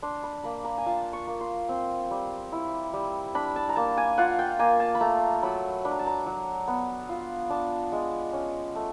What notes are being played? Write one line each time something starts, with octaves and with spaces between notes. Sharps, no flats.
D4 C6
B5
A#3 B5
A#5
G#5
F4 A5
C#6
A#3
C6
C4
G3
E4
G3
D4 B5
A5
A#5
A#3 A5
G#5
F4 F#5
G5
A#3 G#5
A5
B5
A3 A#5
F#3 B5
D4 B5
A#5
A5
A#5
F#3
B3
F4
D4 A5
G#3
C#4
A3